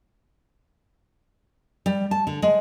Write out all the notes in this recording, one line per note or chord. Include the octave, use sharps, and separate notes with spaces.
G3
A5
D3
G#3